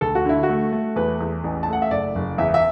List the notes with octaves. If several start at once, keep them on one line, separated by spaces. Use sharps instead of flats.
D2 A4
F#4
D3 E4
F#4
A3
A3
E2 B4
E2
A1
A5
A3 F#5
E5
F#1 D5
F#1
E2 E5
E5